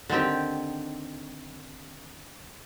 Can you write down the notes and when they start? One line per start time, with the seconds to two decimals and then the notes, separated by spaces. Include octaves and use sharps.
0.10 D3 D#3 C4 G4